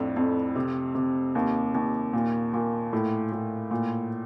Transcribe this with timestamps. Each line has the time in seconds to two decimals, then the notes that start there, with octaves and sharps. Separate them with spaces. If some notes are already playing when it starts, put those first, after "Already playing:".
Already playing: F2 A2 D4
0.16 F2
0.56 C3
0.95 C3
1.35 D#2
1.75 D#2
2.13 A#2
2.53 A#2
2.93 A2
3.32 A2
3.71 A#2